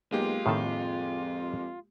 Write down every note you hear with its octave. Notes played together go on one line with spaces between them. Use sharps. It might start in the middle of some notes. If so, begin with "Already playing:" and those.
B1 G#3 A#3 F4 G4
F2 A2 D#3 A4